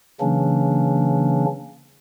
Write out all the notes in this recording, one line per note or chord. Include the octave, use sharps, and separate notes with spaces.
C#3 E3 F#3 A#3 C#4 D4